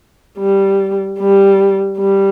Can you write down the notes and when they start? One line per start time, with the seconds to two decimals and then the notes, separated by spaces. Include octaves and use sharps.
0.39 G3
1.19 G3
1.98 G3